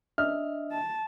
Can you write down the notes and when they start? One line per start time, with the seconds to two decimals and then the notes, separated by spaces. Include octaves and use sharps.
0.18 D4 D#5 E5 F6
0.72 A5